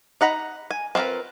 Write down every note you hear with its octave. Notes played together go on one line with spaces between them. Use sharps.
D#4 F#5 A#5 B5
G#5
C4 F4 G#4 A#4 B4